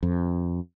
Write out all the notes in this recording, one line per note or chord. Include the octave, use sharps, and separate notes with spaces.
F2